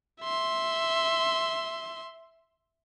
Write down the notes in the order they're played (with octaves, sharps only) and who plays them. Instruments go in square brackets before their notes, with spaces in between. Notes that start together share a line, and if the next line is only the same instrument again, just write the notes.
[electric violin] E5 C6